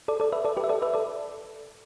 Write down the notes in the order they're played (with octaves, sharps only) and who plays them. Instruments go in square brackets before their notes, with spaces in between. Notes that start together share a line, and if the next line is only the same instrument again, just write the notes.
[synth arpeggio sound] A4 D5
A4 D5
B4 E5
A4 D5
G4 B4
E5
A4 D5
B4 E5
A4 D5